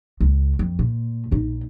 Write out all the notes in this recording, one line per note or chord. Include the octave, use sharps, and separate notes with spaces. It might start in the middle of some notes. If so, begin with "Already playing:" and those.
C#2
F2
A#2
A#1 D#4